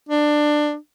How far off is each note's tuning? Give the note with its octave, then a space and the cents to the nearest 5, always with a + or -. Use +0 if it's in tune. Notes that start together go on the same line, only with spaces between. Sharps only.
D4 +15